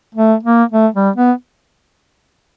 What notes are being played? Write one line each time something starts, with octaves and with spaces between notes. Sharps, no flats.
A3
A#3
A3
G3
B3